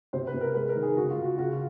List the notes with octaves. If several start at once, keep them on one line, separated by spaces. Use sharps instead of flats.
C3 C5
B4
C3
A#4
G#3 B4
A#4
D#3
G#4
C#3 F#4
F4
C#3
F#4
C#3 F#4
F4